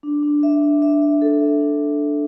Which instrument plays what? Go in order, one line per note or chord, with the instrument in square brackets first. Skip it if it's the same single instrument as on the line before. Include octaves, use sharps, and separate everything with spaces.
[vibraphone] D4
D4
E5
D4
E5
E5
A4
E5
D4